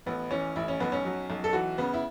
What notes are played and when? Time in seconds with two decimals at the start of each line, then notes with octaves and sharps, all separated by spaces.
0.06 A1 B3
0.31 E3 C#4
0.56 A1 E4
0.68 C#4
0.80 B1 B3
0.92 C#4
1.05 F#3
1.30 B1
1.44 A4
1.53 E3 F#4
1.78 C#3 B3
1.94 E4